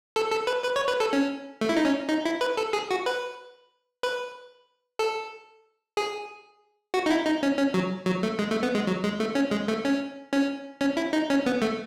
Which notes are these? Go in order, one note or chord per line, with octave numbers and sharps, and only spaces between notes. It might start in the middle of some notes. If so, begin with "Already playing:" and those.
A4
A4
B4
B4
C#5
B4
A4
C#4
A3
E4
D#4
C#4
D#4
E4
B4
A4
G#4
F#4
B4
B4
A4
G#4
F#4
D#4
E4
D#4
C#4
C#4
F#3
F#3
A3
G#3
A3
B3
G#3
F#3
G#3
A3
C#4
G#3
A3
C#4
C#4
C#4
E4
D#4
C#4
B3
A3